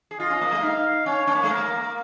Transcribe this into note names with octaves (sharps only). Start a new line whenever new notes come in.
G#4
F4 D#5
C#4
A#3
G#3
D#4 F5
C#4 C#5
C#4
A#3
G#3
A#3 A#4